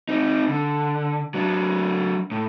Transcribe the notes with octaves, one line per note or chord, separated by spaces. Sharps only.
C4 D#4
D3
F#3 D4
A2